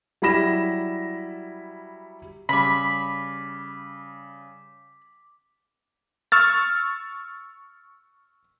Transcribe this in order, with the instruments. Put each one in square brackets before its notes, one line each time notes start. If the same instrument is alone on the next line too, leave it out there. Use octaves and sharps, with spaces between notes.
[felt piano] F#3 G3 E4 B5 A#6 E7
[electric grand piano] C#3 G3 [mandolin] B5 [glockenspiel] D6 B6
[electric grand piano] C#6 E6 F6 A6